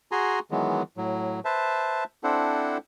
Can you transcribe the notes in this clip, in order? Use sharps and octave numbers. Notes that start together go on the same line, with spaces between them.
F#4 G#4 G#5 A#5 C6
D#3 E3 F#3 G#3 B3
A2 F#3
B4 C5 E5 A5
C4 D4 E4 A4 C5 F#5